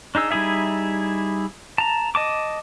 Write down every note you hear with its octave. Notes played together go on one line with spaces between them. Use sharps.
D4 D#4 G#4 E6
G3 D#4 E4 G#4 E5
A5 A#5
D#5 A5 D6